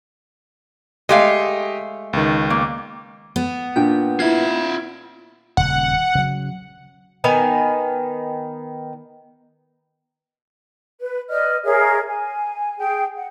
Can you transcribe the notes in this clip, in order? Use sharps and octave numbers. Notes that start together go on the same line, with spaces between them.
G#3 A3 G4 D#5 F5
C#2 D#3
A#3
B3
A#2 D4 G5 G6
E4 F4 E5 G#6
D#1 C#3 F#5
C#3 F#3
D#3 B3 G#5
B4
B4 D5 D#5 F6
G#4 A#4 C#5 E5
G#5
G#4 G5
F#5